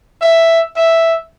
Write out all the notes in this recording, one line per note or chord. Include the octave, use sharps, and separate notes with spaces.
E5
E5